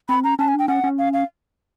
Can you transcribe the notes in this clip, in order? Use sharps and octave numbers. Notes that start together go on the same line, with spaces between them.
C4 B5
C#4 A#5
C#4 A5
G#5
D4
G5
C#4 F#5
C#4
F5
F5